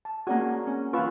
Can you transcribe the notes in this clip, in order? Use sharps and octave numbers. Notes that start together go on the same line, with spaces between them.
A5
A#3 C#4 F#4 G#4 D5 A#5
C#4
E3 F4 B4 F5 C#6 E6